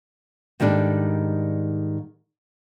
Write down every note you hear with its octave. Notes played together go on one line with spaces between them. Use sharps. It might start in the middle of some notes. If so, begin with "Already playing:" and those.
G#2 D#3 G3 D4 A4